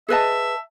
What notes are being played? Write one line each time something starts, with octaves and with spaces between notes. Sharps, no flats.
G#4 B4 D#5 E5 A5